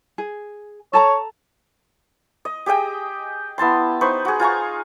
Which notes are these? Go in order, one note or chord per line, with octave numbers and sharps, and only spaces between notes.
G#4
A4 C#5 A5 A#5
D#5
G4 G#4 D#5 G5
B3 E4 A5 C6
D#4 B4 C5 C#6
F#4 G#4
F4 G#5 A#5 C#6